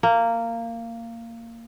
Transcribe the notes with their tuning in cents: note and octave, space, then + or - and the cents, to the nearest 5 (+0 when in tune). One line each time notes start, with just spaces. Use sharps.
A#3 -15